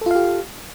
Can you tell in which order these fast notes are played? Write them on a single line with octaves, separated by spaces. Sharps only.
A4 F4 F5 G4